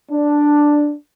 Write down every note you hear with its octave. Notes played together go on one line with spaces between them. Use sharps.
D4